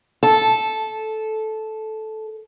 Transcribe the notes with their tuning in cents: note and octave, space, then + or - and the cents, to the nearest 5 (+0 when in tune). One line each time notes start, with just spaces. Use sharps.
A4 -10